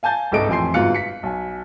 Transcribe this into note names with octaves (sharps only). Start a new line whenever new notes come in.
F5 G#5 A5 G6 A6
G1 C2 G#2 A4 D#5 D7
A1 F2 G#5 C6 C7
G1 G#2 B2 F4 F#6 C#7
B6 C#7
B1 G#5